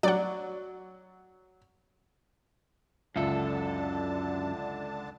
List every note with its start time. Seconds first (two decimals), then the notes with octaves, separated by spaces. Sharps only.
0.03 F#3 D5 F#5
3.16 C#2 F#2 D3 D4 A4 E5 A5